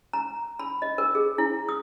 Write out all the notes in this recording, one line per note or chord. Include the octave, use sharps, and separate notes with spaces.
A#5
B5
D#5
A#4
G#4
E4
D#6